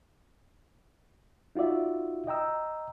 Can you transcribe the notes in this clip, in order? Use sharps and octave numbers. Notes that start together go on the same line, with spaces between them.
D#4 F4 F#4 D5 E5
D#5 G5 A#5 E6